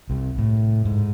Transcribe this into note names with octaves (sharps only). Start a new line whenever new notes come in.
C2
A2
G#2